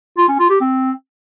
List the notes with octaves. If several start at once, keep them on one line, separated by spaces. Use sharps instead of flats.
F4
C#4
F4
G4
C4